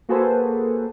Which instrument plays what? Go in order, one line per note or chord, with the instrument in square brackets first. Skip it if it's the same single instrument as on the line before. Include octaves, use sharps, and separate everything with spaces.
[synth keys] A#3 F#4 G#4 A4 B4 C5